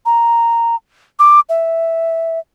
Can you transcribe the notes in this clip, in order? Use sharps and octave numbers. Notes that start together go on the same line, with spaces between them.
A#5
D6
E5